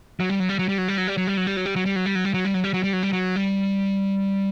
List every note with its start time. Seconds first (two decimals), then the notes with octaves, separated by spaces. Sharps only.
0.20 F#3
0.29 G3
0.40 F#3
0.49 G3
0.59 F#3
0.69 G3
0.78 F#3
0.88 G3
0.98 F#3
1.07 G3
1.18 F#3
1.27 G3
1.37 F#3
1.47 G3
1.57 F#3
1.66 G3
1.76 F#3
1.86 G3
1.96 F#3
2.06 G3
2.15 F#3
2.25 G3
2.34 F#3
2.45 G3
2.54 F#3
2.64 G3
2.74 F#3
2.83 G3
2.93 F#3
3.03 G3
3.13 F#3
3.36 G3